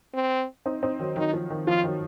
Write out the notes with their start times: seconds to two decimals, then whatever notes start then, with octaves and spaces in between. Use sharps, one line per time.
0.14 C4
0.66 C4 D#4
0.83 C4 D#4
1.00 D#3 F#3
1.16 D#3 F#3 D#4
1.34 F3
1.50 D#3
1.67 F3 F4
1.84 D#3 F#3